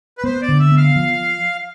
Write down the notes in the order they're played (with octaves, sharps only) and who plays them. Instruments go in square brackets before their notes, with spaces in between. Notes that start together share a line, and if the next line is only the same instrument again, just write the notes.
[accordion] B4
[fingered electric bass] B3 [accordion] C5
[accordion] D5
[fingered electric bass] D3
[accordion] E5
[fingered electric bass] B3
[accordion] F5
[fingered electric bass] F3